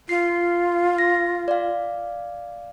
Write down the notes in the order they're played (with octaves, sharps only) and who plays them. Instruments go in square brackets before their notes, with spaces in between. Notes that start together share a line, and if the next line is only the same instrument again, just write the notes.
[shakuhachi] F4 [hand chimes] C7
[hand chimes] A#6
D5 F5